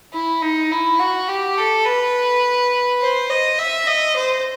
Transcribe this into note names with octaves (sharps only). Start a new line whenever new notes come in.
E4
D#4
E4
F#4
G4
A4
B4
C5
D#5
E5
D#5
C5